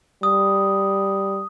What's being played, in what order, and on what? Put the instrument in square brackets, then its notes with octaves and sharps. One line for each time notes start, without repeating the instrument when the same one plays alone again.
[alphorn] G3 [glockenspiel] D#6